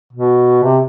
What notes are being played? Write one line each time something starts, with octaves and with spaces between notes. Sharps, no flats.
B2
C3